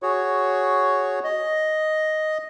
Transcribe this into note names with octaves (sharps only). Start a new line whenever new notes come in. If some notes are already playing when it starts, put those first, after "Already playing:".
F#4 G#4 C#5
D#5